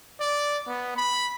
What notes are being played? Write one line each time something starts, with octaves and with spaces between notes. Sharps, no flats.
D5
B3
B5